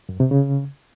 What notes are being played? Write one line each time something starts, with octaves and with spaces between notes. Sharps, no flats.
F#2
C3
C#3